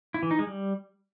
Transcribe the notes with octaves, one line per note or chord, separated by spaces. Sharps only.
E4
E3
D#4
G#3
G3